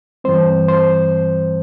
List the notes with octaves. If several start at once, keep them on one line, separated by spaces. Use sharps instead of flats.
G2 E3 G3 C4 C5
C5